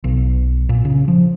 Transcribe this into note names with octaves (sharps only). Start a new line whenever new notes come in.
B1
A#2
C#3
F3